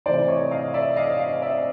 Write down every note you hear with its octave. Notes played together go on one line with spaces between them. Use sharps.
C3 E3 A3 C5 D5
C#5 D#5
D#5 F5
D5 E5
D#5 F5
D#5 F5
D5 E5
F5